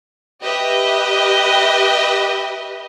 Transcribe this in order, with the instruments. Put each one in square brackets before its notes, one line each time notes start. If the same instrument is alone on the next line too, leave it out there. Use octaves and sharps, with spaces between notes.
[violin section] G4 B4 D#5 E5